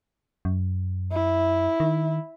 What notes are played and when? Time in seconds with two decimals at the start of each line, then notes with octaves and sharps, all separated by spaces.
0.45 F#2
1.12 E4
1.80 D#3